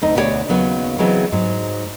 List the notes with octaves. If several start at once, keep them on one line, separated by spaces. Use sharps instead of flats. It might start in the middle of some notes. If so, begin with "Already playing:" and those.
D2 C4 D#4
D2 B2 D#4 G4 C#5 D5
D#2 C#3 F#3 B3
C#3 E3 F#3 G#3 B3 C4
G#2 F#3